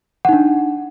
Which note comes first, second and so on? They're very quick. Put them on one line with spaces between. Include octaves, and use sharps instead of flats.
F#5 D#4 D4